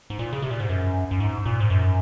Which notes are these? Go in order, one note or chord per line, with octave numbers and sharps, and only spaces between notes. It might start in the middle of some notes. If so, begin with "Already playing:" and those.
G#2
A#2
C#3
C3
A#2
G#2
F#2
F#2
G#2
A#2
G#2
F#2